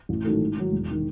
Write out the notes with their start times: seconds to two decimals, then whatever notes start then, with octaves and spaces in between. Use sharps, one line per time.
0.09 A1
0.24 G#2 D#3 F#3 A3
0.41 G#2
0.57 D#3 F#3
0.72 E1
0.91 D#3